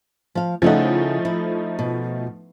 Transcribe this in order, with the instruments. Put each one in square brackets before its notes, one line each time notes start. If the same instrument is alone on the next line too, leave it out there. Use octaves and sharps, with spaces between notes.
[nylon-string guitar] F3 F5
[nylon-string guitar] C#3 E4 F#5 [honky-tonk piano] F3 A3 D#4
[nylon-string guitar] E4
B2